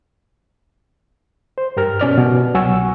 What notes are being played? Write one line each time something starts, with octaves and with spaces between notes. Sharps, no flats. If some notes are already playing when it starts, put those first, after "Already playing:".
C5
G2 G4 A#4 F6
B2 C#4 D5 F6
B2
C2 F#3 F#5 G#5 C#6 E6